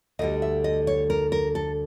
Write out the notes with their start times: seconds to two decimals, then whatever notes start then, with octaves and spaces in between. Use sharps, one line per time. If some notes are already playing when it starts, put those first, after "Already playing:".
0.19 D2 D3 G3 D#5
0.42 E5
0.64 D#5
0.87 C#5
1.10 A#4
1.32 A#4
1.55 A4